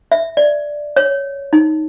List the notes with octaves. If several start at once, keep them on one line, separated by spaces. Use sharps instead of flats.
E5
D5
C#5
D#4